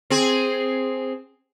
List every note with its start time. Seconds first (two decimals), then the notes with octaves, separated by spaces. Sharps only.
0.10 C4 G#4